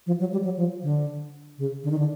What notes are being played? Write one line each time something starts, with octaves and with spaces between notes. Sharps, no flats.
F3
F#3
G3
F#3
F3
D3
C#3
D3
D#3
D3